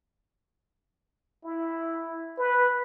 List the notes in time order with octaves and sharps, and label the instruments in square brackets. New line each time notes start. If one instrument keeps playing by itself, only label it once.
[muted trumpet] E4
B4